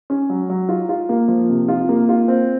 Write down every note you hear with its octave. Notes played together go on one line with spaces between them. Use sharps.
C#4
F#3
F#3
F4
F4
A#3
F3
C3
F4
A#3
F4
C4